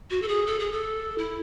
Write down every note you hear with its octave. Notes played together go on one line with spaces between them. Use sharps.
F#4
A4
G#4
A4
G#4
A4
E4